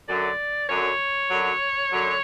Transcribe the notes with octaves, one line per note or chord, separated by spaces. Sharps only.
F#2 D3 F#3 D5
F#2 D3 F#3 C#5
F#2 D3 F#3
F#2 D3 F#3